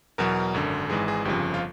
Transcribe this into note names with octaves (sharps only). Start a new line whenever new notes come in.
E2 B2 F#3 A#4
G#1 F#2 D3
G#1 G#2 E3 G#4
G#4
G1 F2 C#3 F3 G4
F4